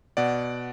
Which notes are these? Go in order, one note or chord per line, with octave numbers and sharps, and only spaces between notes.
B2 D5 F#5